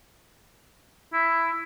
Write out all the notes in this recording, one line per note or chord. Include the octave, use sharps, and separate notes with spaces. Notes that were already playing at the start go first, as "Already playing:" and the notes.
E4